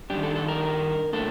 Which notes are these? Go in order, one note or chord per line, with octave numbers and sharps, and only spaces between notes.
D#3 G3 D4 G4
A4
A4
A#4
A#2 A3 D4 A4